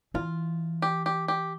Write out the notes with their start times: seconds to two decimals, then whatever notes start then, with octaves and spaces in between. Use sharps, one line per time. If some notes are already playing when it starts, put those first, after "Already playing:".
0.14 E3 F4
0.82 G4
1.06 G4
1.28 G4